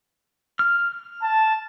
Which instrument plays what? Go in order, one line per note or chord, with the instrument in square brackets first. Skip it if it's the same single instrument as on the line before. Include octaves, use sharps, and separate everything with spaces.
[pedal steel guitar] F6
[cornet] A5